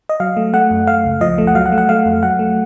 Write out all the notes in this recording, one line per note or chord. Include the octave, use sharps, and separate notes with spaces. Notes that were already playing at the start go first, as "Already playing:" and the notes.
D#5
F#3 F5
A3
A3 F#5
F#2
A3 F5
C#2
F3 D#5
A3
F#5
F#3 F5
F#5
A3
F#5
A3 F5
F2
F#3 F#5
A3